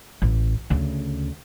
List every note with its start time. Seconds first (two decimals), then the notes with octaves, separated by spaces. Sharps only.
0.22 A1
0.70 D2 C#3